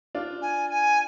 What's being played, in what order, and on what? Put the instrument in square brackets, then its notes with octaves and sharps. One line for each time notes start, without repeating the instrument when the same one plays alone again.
[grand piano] D4 F4
[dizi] G#5
G#5